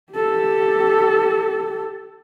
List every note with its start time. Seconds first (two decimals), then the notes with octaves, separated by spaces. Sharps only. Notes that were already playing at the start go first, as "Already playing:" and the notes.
0.13 G4 A4